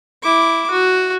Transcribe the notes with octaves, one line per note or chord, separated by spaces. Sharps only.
E4 D6
F#4